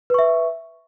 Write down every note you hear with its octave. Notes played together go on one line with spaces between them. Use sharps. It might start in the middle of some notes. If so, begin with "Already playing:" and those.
B4 E5 C#6